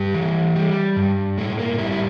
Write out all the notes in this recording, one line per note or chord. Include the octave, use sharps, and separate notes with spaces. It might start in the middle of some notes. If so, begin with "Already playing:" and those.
Already playing: G2 G4
E3
G3
G2
A2 A3
A#3
G3 E4
E4